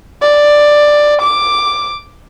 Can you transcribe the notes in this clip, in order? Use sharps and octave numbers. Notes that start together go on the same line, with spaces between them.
D5
D6